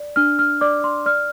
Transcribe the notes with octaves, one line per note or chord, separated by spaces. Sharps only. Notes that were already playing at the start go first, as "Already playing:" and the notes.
Already playing: D5
D4 F6
F6
D5 D6
C6
D5 F6